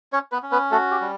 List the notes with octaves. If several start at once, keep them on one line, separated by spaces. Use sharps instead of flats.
C#4 C#5
B3 B4
C#4
B3 B4
A3 F#4 A4
G4
G3